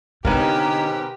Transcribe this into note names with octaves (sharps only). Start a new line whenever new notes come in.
G#2 B2 D3 D#4 G4 A#4 B4